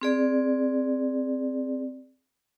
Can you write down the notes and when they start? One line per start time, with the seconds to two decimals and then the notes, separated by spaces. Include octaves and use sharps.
0.01 C4 G#4 D5